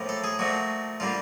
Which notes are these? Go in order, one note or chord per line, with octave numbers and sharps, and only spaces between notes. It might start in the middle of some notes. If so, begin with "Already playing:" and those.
Already playing: A2 F3 A#3
A4
G#4
A#2 F3 A3 F#4
D3 G3 A#3 F4